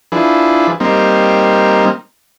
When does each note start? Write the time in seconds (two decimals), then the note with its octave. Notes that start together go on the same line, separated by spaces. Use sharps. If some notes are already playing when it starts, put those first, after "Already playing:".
0.12 F3 D4 E4 G#4 B4
0.80 G3 A#3 C4 D#4